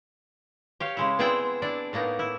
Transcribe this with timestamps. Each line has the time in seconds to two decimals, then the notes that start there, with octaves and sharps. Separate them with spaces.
0.80 G4 C#5 F5
0.97 C#3 G#3 E4
1.19 B3 C4 E4 G#4 D5 G5
1.62 D4 E4 D5
1.93 A2 A#3 B3 D#4
2.19 E4